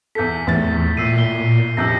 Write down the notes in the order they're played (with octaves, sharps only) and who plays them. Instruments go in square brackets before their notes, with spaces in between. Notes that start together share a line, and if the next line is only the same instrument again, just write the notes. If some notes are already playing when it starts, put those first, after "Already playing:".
[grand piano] E2 A4 [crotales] G6 B6
[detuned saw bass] E2 [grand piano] A2 A6
[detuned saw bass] A#2 [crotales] E6 C7 D#7
[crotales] B6 G7
[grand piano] E1 C2 F2 [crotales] E6 G6 A#6